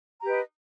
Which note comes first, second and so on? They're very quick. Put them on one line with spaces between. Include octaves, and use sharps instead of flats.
A#5 G4 B4 D#5